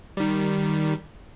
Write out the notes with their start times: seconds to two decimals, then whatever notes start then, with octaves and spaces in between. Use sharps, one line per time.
0.17 D#3 G3